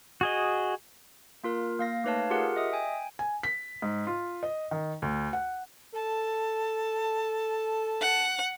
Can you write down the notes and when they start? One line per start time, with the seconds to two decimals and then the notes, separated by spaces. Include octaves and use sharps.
0.21 F#4 G#4 D#5
1.44 A#3 F4 A#4
1.79 A#3 F5 A#6
2.04 A3 D#4 B4 C#5 F5 A5
2.30 F4 G4 G#4 A#4 F#5
2.56 D#5 E5 D#6
2.73 G5 G#5
3.19 G#5
3.43 B6
3.82 G#2
4.07 F4
4.43 D#5
4.71 D#3
5.02 D2
5.33 F#5
5.95 A4 A5
8.01 F#5